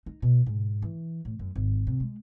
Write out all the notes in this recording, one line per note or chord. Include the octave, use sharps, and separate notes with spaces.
D#4
B2
G#2
E3
A2
F#2
G#1
C3
G#3